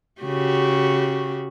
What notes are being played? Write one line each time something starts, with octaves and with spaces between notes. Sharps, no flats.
C#3 F#4 G4